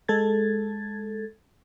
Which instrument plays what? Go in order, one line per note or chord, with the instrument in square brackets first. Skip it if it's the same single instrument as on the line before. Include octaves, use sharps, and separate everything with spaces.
[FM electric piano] G#3 A4 G#6 A6